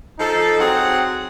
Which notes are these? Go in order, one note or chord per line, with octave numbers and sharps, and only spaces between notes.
F3 D#4 A4
F#3 C4 G#4 F#5